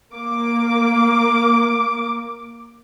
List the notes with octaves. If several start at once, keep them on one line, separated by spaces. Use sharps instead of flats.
A#3 D6